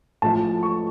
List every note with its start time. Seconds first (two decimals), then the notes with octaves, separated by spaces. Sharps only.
0.22 A1 A2 F3 A3 A5
0.63 C#6